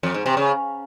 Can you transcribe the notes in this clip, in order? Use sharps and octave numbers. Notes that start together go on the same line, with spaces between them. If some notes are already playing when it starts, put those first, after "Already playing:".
F2
G#2
C3
C#3